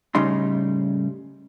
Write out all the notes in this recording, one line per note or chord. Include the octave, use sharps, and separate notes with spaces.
A2 C#3 G3 D#4 C6